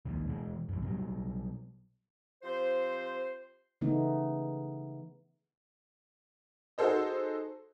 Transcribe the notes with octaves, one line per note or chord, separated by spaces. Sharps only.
E1 A#1 D#2
B2 E3 G#3
A#1 F#2
B2 F#3 G3
F3 C4 G4 C5
C#3 E3 A3 B3 D#4
D#4 F#4 G#4 A4 C5 D#5